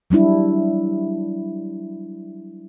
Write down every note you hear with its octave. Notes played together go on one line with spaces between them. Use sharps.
F#3 G3 D4 E4